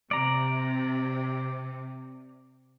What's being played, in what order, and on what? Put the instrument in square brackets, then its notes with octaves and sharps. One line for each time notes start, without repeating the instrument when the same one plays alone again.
[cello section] C3 [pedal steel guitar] D5 A#5